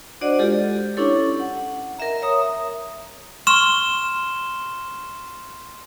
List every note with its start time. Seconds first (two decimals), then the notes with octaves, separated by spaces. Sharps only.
0.21 D4 F#4 C5 D5 D#5 F#5
0.39 G#3 F4 G4 A4
0.97 C#4 D4 E4 G4 A4 C#5
1.40 F#5
1.98 A#4 D#5 E5 A#5
2.22 C#5 E5 A#5 D#6
3.47 C6 C#6 F6 E7 G7